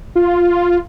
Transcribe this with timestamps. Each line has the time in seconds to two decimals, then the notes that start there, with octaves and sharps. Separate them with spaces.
0.16 F4